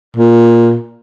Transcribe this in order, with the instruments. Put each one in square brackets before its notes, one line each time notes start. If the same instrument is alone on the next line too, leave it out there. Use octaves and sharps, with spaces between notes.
[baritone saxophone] A#2